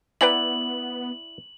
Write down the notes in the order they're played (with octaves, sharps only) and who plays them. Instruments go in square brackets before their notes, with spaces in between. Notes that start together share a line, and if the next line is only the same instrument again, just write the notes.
[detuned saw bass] B3 [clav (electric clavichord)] E4 D5 F#5 [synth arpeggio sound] B4 G5 A#5 [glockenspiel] F#7